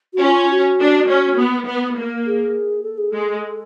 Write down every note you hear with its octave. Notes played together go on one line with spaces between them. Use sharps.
F#4
C#4 F4
F#4
D4
C#4
B3
B3
A#3
G#4
A4
G#4
G#3 A4